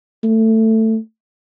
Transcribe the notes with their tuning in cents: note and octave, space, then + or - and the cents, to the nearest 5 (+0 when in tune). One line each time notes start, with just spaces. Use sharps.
A3 +15